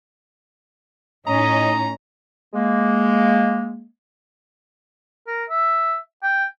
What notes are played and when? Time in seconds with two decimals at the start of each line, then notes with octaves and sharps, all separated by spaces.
1.27 A2 C#4 D#4 D#5 A#5
2.54 G#3 A#3
5.27 A#4
5.49 E5
6.23 G5